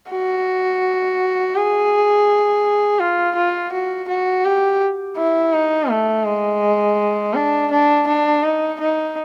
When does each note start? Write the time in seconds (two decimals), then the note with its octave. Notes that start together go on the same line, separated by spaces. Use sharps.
0.10 F#4
1.55 G#4
3.00 F4
3.36 F4
3.72 F#4
4.08 F#4
4.45 G4
5.17 E4
5.53 D#4
5.90 A3
6.26 G#3
7.34 D4
7.71 D4
8.07 D4
8.43 D#4
8.80 D#4